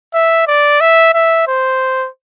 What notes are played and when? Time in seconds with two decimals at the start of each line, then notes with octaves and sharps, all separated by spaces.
0.14 E5
0.47 D5
0.81 E5
1.14 E5
1.47 C5